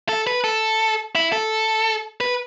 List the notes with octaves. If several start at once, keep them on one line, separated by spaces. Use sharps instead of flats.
A4
B4
A4
E4
A4
B4